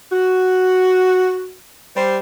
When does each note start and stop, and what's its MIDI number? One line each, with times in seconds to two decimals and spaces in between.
0.12 1.56 66
1.96 2.19 55
1.96 2.19 72